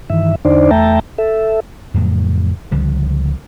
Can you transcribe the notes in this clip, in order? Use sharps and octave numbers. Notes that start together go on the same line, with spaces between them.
G2 D#3 E3 E5
E2 D3 D4 D#4 C5 D5
E2 A3 E5 G5 A5 A#5
A4 E5
F2 A2 C#3 F#3
C#2 D3 F3 G3